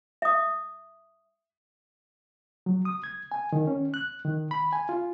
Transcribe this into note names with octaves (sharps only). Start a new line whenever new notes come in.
E5 D#6
F#3
D#6
G#6
G#5
D#3
C#4
F#6
D#3
B5
G#5
F4